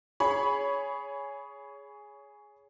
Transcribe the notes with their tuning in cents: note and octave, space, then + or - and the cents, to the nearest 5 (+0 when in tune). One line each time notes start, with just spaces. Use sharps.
G#4 +0 C#5 +20 B5 +0